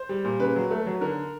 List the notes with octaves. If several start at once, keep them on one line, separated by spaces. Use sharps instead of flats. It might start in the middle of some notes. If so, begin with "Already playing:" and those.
Already playing: C5
G3
A#2
C#3 B4
F#3
A3
F#3
D3 A#4